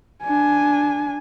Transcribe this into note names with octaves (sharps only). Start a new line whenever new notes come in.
D4 G#5